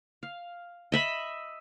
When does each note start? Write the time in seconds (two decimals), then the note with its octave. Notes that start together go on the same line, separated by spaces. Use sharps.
0.23 F5
0.92 D#5 E5 B5